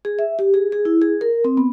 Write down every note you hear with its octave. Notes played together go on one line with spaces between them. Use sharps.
G#4
E5
G4
G#4
G#4
E4
G#4
A#4
C4
B3